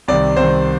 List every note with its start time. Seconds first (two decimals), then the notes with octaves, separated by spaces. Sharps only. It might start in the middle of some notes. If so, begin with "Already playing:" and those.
0.08 C2 C3 D#3 D5
0.36 C2 C3 D#3 C5